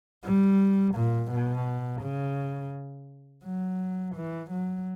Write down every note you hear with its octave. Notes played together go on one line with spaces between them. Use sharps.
G3
A#2
B2
C#3
F#3
E3
F#3